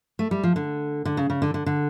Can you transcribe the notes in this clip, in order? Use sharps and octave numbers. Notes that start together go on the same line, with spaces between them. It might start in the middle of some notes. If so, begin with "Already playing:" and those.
A3
G3
F3
D3
D3
C#3
C#3
D3
D3
D3